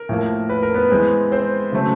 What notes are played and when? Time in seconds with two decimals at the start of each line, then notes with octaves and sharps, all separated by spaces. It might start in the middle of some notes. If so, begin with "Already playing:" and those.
Already playing: A#4
0.09 A2 F3 A#3
0.49 B4
0.63 A#4
0.74 B3 B4
0.90 E3 G#3 C4
1.32 C4 C5
1.72 C#3 F#3 A3 C4